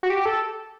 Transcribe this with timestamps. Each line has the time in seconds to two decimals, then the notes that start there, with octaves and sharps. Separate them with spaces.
0.03 F#4
0.10 G4
0.25 A4